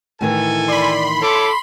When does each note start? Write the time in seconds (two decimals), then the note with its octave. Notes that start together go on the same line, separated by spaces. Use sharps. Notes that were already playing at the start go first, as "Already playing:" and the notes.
0.21 A2 D#3 E3 A4 G#5
0.68 D5 B5 C6
1.21 E4 A4 C#5 D6